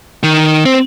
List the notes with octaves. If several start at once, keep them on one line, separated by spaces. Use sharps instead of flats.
D#3
C4